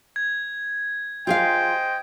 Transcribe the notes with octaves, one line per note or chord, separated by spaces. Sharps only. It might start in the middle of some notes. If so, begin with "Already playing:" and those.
G#6
F4 G#4 C5 D#5 F5 G5